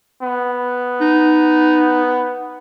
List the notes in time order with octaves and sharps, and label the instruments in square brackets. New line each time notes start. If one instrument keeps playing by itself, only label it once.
[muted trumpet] B3
[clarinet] D#4